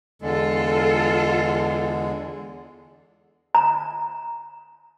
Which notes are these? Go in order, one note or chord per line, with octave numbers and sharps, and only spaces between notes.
E2 D3 G#3 F4 A4
A#5